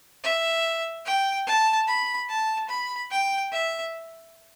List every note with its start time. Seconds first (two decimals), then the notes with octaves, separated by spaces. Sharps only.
0.24 E5
1.06 G5
1.47 A5
1.88 B5
2.29 A5
2.69 B5
3.11 G5
3.52 E5